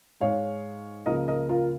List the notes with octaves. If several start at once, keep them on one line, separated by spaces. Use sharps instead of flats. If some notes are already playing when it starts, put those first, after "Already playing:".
G#2 G#3 C#5 F5
C#2 C#3 F3 A#3 A#4 D#5
A#4 D#5
F4 A#4